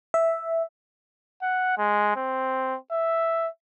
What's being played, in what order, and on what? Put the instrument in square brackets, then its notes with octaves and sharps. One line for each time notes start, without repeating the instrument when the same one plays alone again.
[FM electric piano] E5
[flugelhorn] F#5
G#3
C4
E5